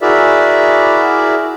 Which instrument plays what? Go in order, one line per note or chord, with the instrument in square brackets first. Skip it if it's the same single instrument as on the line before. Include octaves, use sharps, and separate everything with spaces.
[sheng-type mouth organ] E4 F#4 G#4 A#4 D5 E5